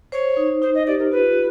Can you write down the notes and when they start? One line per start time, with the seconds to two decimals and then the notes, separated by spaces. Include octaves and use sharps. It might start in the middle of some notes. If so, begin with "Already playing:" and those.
0.12 C5 C#5
0.37 D#4
0.62 D#4 C5
0.74 D#5
0.87 G4 D5
0.99 A#4
1.11 F4 B4